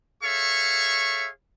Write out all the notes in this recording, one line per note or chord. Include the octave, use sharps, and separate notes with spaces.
G#4 A4 C#5 E5 F5 C#6